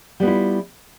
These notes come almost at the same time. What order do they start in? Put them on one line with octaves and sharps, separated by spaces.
G3 B3 F4 E4